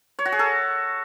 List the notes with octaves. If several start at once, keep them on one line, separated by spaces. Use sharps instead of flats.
C#5
F#4
G#4
A4